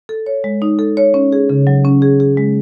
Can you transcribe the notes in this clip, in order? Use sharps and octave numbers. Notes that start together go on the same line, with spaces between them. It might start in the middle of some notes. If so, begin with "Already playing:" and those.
A4
C#5
G#3
D#4
A4
C#5
C#4
G#4
C#3
F#3
C#4
G#4
G#4
G#3